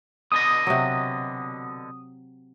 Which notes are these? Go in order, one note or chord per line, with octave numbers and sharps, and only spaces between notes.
B2 D3 D#5 D#6
C3 F#3